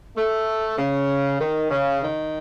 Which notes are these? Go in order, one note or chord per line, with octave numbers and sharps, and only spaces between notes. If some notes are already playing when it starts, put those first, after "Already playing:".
A3
C#3
D#3
C#3
D#3